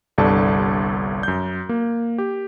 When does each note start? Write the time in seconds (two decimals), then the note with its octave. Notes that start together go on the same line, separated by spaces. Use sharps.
0.18 G1 C2 G2 A4 D5 A5
1.23 F#2 G6
1.69 A#3
2.18 G4